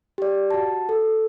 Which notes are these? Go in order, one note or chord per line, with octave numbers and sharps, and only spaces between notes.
G4 D5
F#4 A5
A4